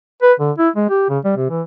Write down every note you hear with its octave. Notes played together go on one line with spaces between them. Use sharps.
B4
D3
E4
G#3
G4
C#3
G3
C3
E3